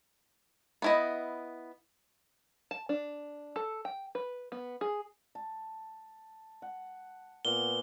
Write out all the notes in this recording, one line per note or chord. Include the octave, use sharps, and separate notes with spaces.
B3 E4 D#5
A5
D4
A4
G5
B4
B3
G#4
A5
F#5
A#2 B3 G#5 G7